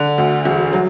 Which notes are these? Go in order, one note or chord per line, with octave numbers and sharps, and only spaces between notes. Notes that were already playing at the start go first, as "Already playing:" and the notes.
Already playing: D3
D2
E1
F#3